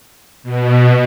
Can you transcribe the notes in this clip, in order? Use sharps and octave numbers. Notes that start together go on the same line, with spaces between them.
B2